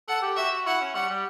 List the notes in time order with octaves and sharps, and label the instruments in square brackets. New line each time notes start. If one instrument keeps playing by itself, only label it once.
[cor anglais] A4 [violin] F#5
[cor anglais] G4
[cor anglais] F#4 [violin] E5
[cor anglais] F#4
[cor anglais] E4 [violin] F#5
[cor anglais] C#4
[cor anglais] G3 [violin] F#5
[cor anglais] G3